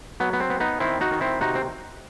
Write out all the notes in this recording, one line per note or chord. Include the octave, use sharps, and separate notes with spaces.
F#3 B3
B3
C4
B3
B3 D#4
D#3 C4 E4
D#4 F#4
D#3
C4 E4
C3 D#4 F#4
C4